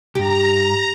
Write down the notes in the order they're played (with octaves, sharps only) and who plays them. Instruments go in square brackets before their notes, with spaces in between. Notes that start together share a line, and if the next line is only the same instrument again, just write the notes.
[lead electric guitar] B1 G2 [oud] G4 [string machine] A#5